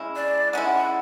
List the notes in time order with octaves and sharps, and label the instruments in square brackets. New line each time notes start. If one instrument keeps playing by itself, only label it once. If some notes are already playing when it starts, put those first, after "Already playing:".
Already playing: [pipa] C#3 G#3 C#4 E4
[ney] D5
[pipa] G#3 C#4 E4 [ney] F#5